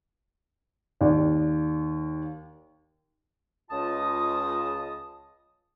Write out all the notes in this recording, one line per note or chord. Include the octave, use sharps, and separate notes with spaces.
D#2 D5
C#2 C#3 F4 D#5 A5 D#6